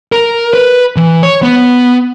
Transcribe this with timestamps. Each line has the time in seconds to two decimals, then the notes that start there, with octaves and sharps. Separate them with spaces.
0.12 A#4
0.53 B4
0.96 E3
1.23 C#5
1.42 B3